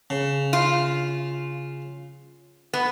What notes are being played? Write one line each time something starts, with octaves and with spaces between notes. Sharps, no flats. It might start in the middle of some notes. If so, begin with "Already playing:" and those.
C#3
F4
B3